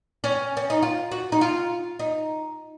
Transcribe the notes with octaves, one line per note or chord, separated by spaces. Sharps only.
C#4
C#4
D#4
F4
F#4
D#4
F4
D#4